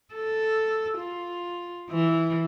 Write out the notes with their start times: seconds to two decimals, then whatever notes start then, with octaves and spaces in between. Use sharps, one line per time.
0.15 A4
0.98 F4
1.90 E3